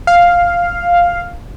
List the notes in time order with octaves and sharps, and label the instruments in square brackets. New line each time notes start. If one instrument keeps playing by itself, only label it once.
[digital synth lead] F5